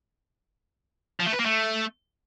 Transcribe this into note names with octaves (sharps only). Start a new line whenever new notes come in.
F3
A3
B4
A#3
A3